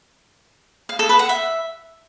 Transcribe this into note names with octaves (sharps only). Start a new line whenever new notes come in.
F5
A4
B4
F#5
E5